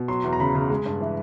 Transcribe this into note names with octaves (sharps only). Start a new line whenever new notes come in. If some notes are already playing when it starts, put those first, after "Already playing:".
Already playing: B2
F#3 C6
E2
A#5
C#3 B5
C#3
G#3
G2
E3